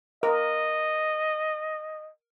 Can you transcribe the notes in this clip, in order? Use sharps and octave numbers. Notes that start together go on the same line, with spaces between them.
A#4 D#5